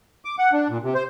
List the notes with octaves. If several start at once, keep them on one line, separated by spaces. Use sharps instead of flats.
D6
F#5
D4
A#2
C3
C5